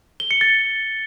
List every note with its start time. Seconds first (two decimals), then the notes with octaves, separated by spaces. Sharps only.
0.20 G7
0.31 C#7
0.41 A6